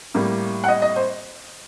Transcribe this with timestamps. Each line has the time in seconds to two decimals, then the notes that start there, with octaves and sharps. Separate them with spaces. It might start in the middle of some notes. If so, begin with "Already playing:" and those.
0.14 A2 G3 A#3
0.64 F#5
0.68 D#5
0.82 D#5
0.96 C5